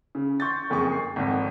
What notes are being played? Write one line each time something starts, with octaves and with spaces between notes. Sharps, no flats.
C#3
C6 C#6 G6 A6
F#1 F2 G#4 C#6
C7
G#1 F2